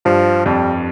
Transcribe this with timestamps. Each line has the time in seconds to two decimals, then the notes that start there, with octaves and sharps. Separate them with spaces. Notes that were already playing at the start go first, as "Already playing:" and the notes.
0.05 G2 F3
0.45 F2 G3